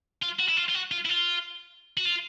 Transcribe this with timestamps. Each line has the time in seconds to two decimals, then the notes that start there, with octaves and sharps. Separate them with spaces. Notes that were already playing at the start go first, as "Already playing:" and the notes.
0.22 F4
0.39 F#4
0.48 E4
0.57 F4
0.69 F4
0.74 F#4
0.91 F4
1.05 E4
1.09 F4
1.97 F#4
2.05 F4